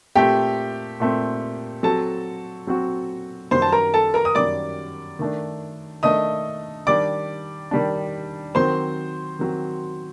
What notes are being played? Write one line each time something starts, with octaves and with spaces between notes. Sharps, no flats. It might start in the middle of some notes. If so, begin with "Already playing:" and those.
A#2 A3 C4 G4 G5
A#2 A3 C4
F#3 C4 F#4 A4 A5
F#3 C4 F#4
F#2 D#3 G3 C5 C6
A5
A#4 A#5
A4 A5
A#4 A#5
D#6
F#2 D#3 G3 D5 D6
D#3 A3 D4
D#3 A3 D4 D#5 D#6
D#3 G3 D4 D5 D6
D#3 G3 D4
D#3 F#3 C4 C5 C6
D#3 F#3 C4